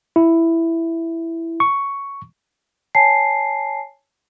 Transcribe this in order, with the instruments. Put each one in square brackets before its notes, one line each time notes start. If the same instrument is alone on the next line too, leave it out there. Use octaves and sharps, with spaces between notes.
[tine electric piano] E4
C#6
[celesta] C#5 G#5 A5 C7